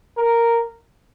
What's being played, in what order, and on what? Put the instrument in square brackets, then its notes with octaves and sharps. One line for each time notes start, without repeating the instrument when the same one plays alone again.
[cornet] A#4